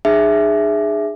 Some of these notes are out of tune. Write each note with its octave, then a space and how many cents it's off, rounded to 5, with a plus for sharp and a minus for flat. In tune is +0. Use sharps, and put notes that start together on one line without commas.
D#4 -45 G#4 -5 E5 +0